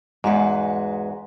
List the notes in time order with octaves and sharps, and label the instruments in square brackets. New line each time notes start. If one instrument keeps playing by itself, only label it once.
[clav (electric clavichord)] E2 G#2 [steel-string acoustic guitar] G#3 F#4 B4